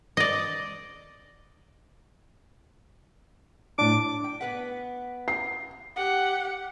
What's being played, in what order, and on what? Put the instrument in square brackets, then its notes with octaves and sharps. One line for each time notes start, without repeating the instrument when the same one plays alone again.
[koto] D5 D#5
[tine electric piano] A2 D4 [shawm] D6
[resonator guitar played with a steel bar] G5
B3 B4 F#5
[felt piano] C7
[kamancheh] G4 F#5